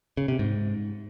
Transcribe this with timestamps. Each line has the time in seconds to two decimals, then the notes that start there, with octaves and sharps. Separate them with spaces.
0.17 C#3
0.28 C3
0.39 G#2